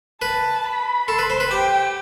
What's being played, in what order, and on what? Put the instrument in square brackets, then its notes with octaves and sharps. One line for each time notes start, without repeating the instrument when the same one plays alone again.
[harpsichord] B4 [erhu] A5
[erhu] B5
[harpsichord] A4 [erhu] C6
[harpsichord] B4
C5
B4
[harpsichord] G4 [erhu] G5